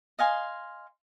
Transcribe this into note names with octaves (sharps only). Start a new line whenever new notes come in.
D#5 F5 G#5 C6